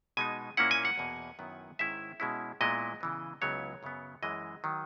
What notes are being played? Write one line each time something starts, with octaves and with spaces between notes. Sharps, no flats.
B2 G#3 B3 D#4 G#5
A#2 A#3 C#4 E4 F#5
G#5
F#5
E2 B2 A#3
F#2 D#3 F#3 B3 E4
G#2 D#3 G#3 C#4 E4 E5
B2 G#3 C#4 E4
A#2 G#3 B3 E4 D#5
C#3 E3 B3
C#2 C#3 F#3 B3 E4 C#5
F#2 C#3 F#3 B3
F#2 E3 G#3 D#5
D#3 F#3